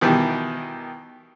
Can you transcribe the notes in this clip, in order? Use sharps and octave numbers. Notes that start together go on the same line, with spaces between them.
B2 D#3 E3 G4